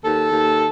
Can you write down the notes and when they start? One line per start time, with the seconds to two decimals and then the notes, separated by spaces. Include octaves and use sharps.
0.05 D#2 A4
0.33 D#2